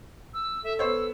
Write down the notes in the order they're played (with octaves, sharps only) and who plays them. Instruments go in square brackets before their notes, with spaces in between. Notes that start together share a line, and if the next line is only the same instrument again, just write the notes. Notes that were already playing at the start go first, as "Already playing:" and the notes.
[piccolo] E6
[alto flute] A4 [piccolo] E5
[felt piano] B3 C5 C#5 [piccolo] E6